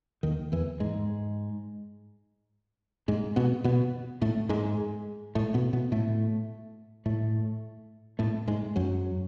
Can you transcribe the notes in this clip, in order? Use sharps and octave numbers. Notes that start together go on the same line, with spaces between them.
D#2 D#3
E2 E3
G#2 G#3
G#2 G#3
B2 B3
B2 B3
A2 A3
G#2 G#3
A2 A3
B2 B3
B2 B3
A2 A3
A2 A3
A2 A3
G#2 G#3
F#2 F#3